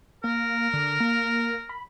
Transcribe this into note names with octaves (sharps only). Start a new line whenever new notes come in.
A#3 A#4
D3
A#3
B5